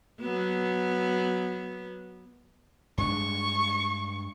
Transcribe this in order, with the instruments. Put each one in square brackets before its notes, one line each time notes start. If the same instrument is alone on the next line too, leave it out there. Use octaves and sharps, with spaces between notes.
[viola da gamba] F#3 B3
[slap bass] G2 G#3 D4 [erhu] C#6